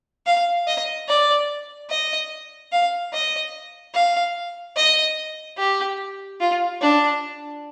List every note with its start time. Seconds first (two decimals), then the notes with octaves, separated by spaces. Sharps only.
0.26 F5
0.67 D#5
1.08 D5
1.90 D#5
2.72 F5
3.13 D#5
3.94 F5
4.76 D#5
5.58 G4
6.40 F4
6.81 D4